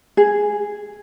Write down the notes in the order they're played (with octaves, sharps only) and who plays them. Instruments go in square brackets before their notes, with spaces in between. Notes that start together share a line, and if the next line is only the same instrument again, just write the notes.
[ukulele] G#4